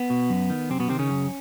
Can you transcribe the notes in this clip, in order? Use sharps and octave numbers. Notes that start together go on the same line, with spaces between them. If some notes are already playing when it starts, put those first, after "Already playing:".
Already playing: B3
B2
F#2
D#3
F#2 C3 C4
B2 B3
C3 D#3 C4
C#3 C#4
F#2